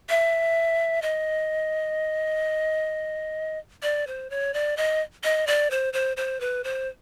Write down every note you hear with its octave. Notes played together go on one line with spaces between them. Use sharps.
E5
D#5
D5
C5
C#5
D5
D#5
D#5
D5
C5
C5
C5
B4
C5